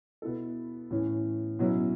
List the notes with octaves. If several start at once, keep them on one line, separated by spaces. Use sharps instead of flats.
B2 B3 E4 A4
A2 E3 C#4
B2 F#3 C#4 E4